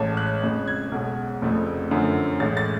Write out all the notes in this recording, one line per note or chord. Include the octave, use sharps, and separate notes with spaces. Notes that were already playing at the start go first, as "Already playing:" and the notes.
Already playing: A1 A2 G#3 A5
F#6
F2 C#3 G#3
G#6
B1 B2 G#3
F1 F2 C#3 F3 A3
F#2 D3 F3 A3
A1 A2 G#3 A6
A6